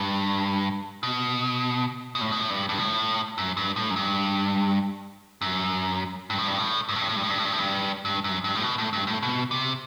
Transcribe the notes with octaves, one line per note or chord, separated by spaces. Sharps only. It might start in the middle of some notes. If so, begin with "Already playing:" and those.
Already playing: G2
B2
B2
A2
B2
A2
G2
G2
A2
F#2
G2
A2
F#2
G2
F#2
G2
A2
G2
A2
G2
A2
G2
A2
G2
A2
G2
A2
G2
A2
G2
G2
F#2
G2
A2
B2
A2
G2
A2
B2
C3